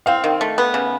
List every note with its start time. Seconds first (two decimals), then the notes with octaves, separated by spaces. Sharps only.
0.06 C4 F5
0.24 D#3
0.41 A3
0.58 B3
0.74 C#3